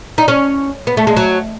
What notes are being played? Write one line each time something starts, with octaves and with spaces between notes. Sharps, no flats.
D#4
C#4
B3
A3
G#3
F#3